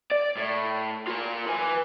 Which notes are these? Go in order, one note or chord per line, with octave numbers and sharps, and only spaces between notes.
D5
A2
F4 A#4
B4 G#5